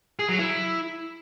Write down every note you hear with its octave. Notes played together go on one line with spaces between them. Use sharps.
G#4
F#3
E4